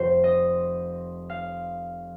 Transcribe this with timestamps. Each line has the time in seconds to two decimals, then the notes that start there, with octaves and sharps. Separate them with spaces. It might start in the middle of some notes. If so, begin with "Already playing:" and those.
Already playing: F1 F2 F3 C5
0.24 D#5
1.30 F5